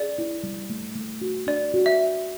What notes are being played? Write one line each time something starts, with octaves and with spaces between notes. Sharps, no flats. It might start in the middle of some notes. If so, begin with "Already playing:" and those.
Already playing: G#4 D5
E4
G3
A3
A3
F#4
D4 D5
F#4
E5